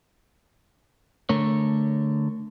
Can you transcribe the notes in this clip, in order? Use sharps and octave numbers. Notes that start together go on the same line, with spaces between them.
D3 A3 A#4 C#5